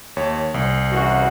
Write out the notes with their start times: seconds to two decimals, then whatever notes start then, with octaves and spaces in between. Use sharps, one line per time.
0.17 D#2 C#5
0.54 C2
0.92 C#2 E3 F#4